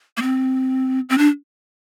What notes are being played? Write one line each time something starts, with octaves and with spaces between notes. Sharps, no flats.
A#3
C4
C4
D4